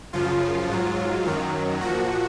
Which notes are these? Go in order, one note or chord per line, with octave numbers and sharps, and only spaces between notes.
F#2 C#3 F3 F4
G#2 F#3
F#2 D#3 F#3
A#2 F3 F#4